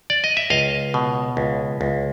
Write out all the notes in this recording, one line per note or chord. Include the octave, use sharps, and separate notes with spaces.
D5
D#5
E5
C#2 D#5 F5
B2
C#2
C#2